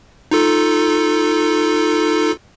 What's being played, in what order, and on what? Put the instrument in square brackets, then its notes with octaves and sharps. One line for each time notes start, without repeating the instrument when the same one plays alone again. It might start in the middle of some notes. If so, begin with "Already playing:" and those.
[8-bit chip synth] D#4 F4 A4